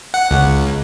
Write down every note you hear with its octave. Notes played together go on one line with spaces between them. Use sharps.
F#5
C#2